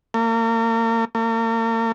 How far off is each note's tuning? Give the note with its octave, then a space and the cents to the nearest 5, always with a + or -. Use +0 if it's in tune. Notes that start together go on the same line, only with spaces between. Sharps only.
A#3 -35
A#3 -40